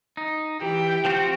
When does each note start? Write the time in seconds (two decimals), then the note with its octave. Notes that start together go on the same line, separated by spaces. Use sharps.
0.17 D#4
0.61 E3 G4 G5
1.05 F3 C4 F#4